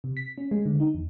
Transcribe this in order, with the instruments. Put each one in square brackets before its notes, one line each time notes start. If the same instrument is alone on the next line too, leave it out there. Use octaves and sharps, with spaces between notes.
[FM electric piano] C3
B6
C#4
G#3
D3
D#4
E2